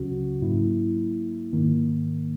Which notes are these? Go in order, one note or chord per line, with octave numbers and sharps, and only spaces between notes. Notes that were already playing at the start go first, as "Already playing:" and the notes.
Already playing: C#2 C#3 F#3 C#4 F#4
G#2 F#3 A#3 E4
G#2 D#3 A#3